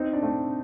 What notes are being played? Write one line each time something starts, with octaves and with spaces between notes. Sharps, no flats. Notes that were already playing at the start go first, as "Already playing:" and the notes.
Already playing: C4 D#4
D4
A3 C4